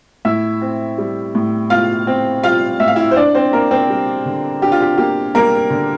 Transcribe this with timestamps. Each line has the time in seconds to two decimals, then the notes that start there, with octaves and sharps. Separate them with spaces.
0.25 A2 E4 E5
0.61 C4
0.98 G3
1.35 A2
1.70 A2 F4 F5
2.07 C4
2.43 G3 F4 F5
2.80 A2 E5
2.88 F5
2.96 E4 E5
3.11 C5
3.16 D4 D5
3.35 C4 C5
3.53 A#3 A#4
3.71 C4 C5
3.90 G3
4.26 D3
4.62 D4 G4
4.72 F4
4.82 G4
4.98 A#3 G4
5.35 G3 A#3 A#4
5.70 D3